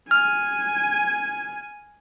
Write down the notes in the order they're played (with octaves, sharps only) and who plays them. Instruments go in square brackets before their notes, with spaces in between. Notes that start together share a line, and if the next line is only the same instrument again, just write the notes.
[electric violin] G#5 [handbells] F6